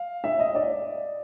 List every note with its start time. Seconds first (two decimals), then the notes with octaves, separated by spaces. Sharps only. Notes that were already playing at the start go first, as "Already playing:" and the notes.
Already playing: F5
0.24 E5
0.39 D#5
0.55 D5